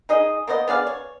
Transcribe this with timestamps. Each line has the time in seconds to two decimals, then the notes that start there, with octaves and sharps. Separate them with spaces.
0.09 D#4 G#4 D#5
0.47 A#3 B3 C5 D#5
0.68 B3 G#4 D5 F5
0.87 C#5